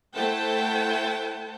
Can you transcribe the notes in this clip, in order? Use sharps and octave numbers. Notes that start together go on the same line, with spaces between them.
A3 E4 C5 F#5 G5 A5